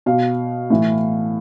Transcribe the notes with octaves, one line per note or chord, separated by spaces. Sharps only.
B2 F5
A2 E3